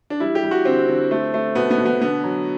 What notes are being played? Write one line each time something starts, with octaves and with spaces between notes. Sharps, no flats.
D4
G3 E4
G4
G3
F#4
D3 C4
D3
A3
A3
B2 B3
B3
B2
B3
D3 B3
F#3